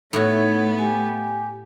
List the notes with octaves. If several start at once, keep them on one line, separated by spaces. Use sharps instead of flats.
A2 A3 B3 D#4 E4 F#4 C#5
G4 G#5